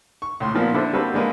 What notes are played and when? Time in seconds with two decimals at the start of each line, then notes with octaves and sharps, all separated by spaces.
0.22 C#6
0.40 C#2 A2 C6
0.55 A#2 F3 A#3 B3
0.74 D3 D4 E4 A4 C5
0.93 G3 A#3 C4 F#4 A4 B4
1.14 D3 G#3 A#3 B4